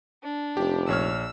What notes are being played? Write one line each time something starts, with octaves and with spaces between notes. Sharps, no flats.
D4
F1 G4
A#1 C#5 E6 F6